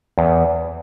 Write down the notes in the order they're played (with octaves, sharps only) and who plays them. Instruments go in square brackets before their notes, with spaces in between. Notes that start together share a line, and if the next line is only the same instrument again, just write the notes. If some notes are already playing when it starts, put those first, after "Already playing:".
[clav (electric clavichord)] E2